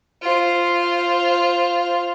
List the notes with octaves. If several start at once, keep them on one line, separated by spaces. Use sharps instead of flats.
F4 C5